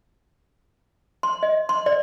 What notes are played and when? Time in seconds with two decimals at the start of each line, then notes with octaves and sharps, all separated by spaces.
1.23 C6
1.43 D#5
1.69 C6
1.86 D5